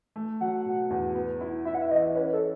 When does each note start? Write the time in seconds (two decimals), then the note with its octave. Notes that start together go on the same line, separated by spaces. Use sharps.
0.16 A3
0.41 F#3 F#5
0.66 B2
0.90 E2
1.15 B3
1.41 E4
1.65 E4 E5
1.75 F#5
1.82 E5
1.91 E3 D#5
2.15 C#4 B4
2.33 A4